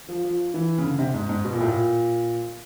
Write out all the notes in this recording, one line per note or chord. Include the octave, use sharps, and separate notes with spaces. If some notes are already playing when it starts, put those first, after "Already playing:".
F3
F3
E3
C#3
D3
C3
G#2
G#2
B2
A#2
A2
A#2